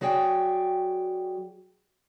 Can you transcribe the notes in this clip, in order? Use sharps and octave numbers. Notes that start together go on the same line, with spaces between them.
F#3 F#4 G#4 D5 G5